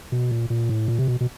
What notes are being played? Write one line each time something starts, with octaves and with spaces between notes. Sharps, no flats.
B2
A#2
A#2
A2
A#2
C3
B2
B2